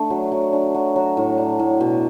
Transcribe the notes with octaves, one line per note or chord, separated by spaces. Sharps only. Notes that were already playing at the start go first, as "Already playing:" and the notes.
Already playing: A3 D4
F#3
F#3
D4
F#3
F#3
A2
D4
A2
B2